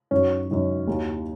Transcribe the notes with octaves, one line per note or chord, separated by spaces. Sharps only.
F#2 D#3 F#3 C#4
F#2 D#3 F#3
D#2 D#3 F#3